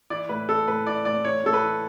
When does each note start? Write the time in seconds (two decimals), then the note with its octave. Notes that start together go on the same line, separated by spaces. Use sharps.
0.10 E3 D5
0.29 A2 B4
0.49 E3 A4
0.67 A2 B4
0.87 E3 D5
1.05 A2 D5
1.25 E3 C#5
1.44 A2 A4
1.53 B4
1.63 E3